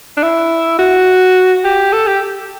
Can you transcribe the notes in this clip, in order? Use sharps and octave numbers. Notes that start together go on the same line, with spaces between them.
D4
E4
F#4
G4
A4
G4